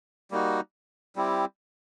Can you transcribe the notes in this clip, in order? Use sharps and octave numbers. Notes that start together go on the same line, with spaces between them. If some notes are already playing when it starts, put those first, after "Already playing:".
G3 A#3 D#4 F#4
G3 C4 E4 G4